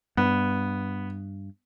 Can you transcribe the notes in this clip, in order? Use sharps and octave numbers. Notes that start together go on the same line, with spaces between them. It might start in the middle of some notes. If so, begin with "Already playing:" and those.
G2 B3